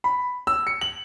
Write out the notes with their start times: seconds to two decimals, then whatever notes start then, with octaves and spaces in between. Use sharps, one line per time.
0.04 B5
0.47 E6
0.67 C#7
0.81 F#7